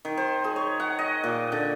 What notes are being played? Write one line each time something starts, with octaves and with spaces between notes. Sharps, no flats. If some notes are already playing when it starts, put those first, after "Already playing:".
D#3
C5
G#4
C#5
F#5
D#5
A#2
D3